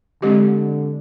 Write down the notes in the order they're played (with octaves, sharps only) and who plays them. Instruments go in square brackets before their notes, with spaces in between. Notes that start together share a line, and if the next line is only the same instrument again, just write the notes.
[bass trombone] D3 [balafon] G#3 C4 G4